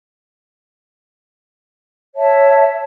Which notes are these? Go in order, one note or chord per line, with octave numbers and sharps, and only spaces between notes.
C#5 E5 A5